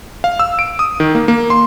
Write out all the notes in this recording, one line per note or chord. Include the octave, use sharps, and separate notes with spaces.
F5
E6
D7
D#6
D#3
A#3
A#3
C6